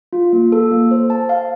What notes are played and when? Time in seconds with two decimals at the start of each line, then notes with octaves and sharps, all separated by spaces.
0.13 F4
0.33 A#3
0.52 A4
0.72 A#3
0.91 C5
1.10 A5
1.29 F5